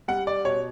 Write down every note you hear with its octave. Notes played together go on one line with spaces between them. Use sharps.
G3 F#5
D5
B2 C#5